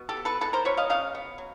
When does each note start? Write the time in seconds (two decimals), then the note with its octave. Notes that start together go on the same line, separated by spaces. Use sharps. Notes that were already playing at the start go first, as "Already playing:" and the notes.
Already playing: B2
0.09 G4 A4
0.17 B3
0.25 A4 B4
0.41 G#3 A4 B4
0.53 A#4 C5
0.65 B2 B4 C#5
0.77 D#5 F5
0.90 C#3 D#5 F5
1.15 B3
1.38 F#3